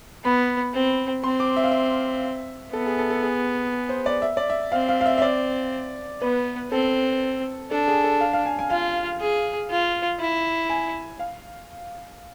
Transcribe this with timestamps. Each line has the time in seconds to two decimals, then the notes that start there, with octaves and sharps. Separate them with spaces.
0.24 B3 B5
0.74 C4
1.24 C4 C6
1.40 D6
1.56 E5
1.64 F5
1.71 E5
2.73 B3 A4
2.86 G#4
2.99 A4
3.10 A4
3.23 G#4
3.89 C5
4.06 D5
4.22 E5
4.37 D5
4.50 E5
4.72 C4 F5
4.89 F5
5.01 F5
5.06 E5
5.18 E5
5.22 D5
6.22 B3 B4
6.71 C4 A4
7.71 D4 A4
7.88 G#4
8.04 A4
8.21 F5
8.33 F5
8.46 G#5
8.59 G#5
8.70 F4 F5
9.21 G#4
9.70 F4
10.20 E4
10.69 G#5
11.19 F5